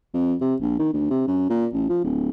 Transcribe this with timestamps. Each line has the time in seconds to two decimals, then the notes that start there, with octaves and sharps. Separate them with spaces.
0.14 F2
0.41 C3
0.61 A#1
0.79 D#3
0.93 D2
1.10 C3
1.27 F#2
1.50 A#2
1.73 A1
1.89 F3
2.04 D1